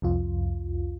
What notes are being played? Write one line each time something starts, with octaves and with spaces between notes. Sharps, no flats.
C2 F2 F4